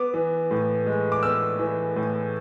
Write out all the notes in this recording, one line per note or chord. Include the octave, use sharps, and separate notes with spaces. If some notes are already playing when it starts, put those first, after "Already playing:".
Already playing: B3 D6
E3
A2
G#3
D6
B3 E6
E3
A2